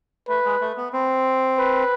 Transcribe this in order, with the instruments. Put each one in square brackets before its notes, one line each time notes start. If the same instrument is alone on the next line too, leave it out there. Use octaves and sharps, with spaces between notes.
[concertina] A3 [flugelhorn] B4
[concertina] G#3
A3
B3
C4
[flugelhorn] B4